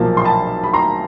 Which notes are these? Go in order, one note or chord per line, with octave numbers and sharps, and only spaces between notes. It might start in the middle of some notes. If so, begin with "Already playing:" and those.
Already playing: B1 A#2 F3 A#3 A5
C6
A5 B5
B5
A#5 C6